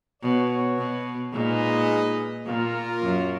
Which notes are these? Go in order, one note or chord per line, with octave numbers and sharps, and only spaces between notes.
B2 B3 F#4 C#5
B2
A#2 G#3 D#4 G#4 B4 D#5
A#2 A#3 F4 A#4
F#2